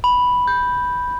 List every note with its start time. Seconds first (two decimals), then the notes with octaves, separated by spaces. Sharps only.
0.04 B5
0.48 G6